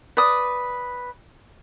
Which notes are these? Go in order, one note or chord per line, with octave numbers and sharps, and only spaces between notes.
B4 D5 D#6